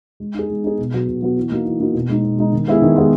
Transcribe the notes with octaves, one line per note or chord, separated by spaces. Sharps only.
G#3
D#4 G#4
G#3
D#4 G#4
B2
F#3 B3 F#4
B2
F#3 B3 F#4
E3
A#3 D#4 F#4
E3
A#3 D#4 F#4
B2
G#3 D#4
B2
G#3 D#4
D#3
G#3 B3 E4 G#4
D#3
G#3 B3 E4 G#4